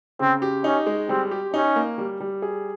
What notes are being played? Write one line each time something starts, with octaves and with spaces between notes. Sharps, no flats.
C#3 C4
G4
C#4 D#4
G#3
G3 C4
G4
C#4 D#4
A#3
G3
G3
G#4